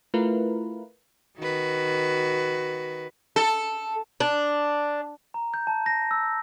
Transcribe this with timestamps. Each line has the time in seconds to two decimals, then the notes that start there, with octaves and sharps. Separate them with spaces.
0.14 A3 E4 F4 A#4 B4
1.38 D#3 F#4 B4
3.36 A4
4.20 D4
5.34 A#5
5.54 G6
5.67 A5
5.86 A#6
6.11 E6